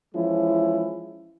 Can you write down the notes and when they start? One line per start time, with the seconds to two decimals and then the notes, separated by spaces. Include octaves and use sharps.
0.14 E3 F3 G#3 C#4 E4